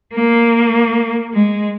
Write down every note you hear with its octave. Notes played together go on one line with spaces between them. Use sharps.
A#3
G#3